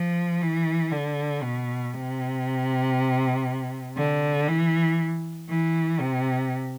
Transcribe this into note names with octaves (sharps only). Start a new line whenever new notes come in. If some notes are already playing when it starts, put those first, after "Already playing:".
Already playing: F3
E3
D3
B2
C3
D3
E3
E3
C3